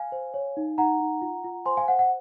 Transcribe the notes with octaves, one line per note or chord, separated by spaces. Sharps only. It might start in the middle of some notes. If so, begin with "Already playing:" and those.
Already playing: F5 G#5
C5
C#5
D#4
D#4 F#5 A#5
D#4
F4
F4
C5 G#5 C6
F5 G#5
C5 F#5
F#5